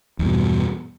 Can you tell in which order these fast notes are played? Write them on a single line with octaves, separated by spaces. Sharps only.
E2 G2 B2